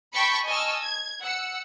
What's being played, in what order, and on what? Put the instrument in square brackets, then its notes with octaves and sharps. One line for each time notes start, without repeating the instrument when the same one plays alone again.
[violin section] G5 A5 B5 C#6 B6 C#7
D#5 G#5 A5 C#6 E6 F6
G#6
F#5 E6 C#7